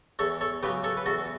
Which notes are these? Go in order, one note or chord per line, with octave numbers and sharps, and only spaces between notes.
E2 A4 C#5
A4 C#5
C#3 F#3 G4 B4
A4 C#5
B4
E2 F#4 A4